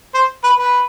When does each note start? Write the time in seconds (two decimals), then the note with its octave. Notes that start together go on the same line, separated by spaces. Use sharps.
0.15 C5
0.44 B4
0.58 B4